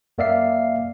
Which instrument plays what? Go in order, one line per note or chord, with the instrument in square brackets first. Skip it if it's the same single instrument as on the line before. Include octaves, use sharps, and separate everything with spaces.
[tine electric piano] F#2 A#3 D5 E5 F5 C7